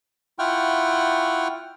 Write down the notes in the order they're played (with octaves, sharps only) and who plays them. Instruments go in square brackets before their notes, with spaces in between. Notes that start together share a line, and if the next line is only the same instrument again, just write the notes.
[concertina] E4 F4 F#5 G5 C#6 F6